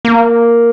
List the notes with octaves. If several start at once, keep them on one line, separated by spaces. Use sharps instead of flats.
A#3